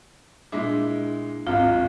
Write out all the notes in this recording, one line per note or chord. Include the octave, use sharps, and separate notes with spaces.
A#2 G#3 D4 E4
D1 G#1 C4 F4 F5